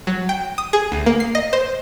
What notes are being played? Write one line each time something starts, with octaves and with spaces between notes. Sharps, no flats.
F#3
G5
D#6
G#4
D2
A#3
C7
D#5
C5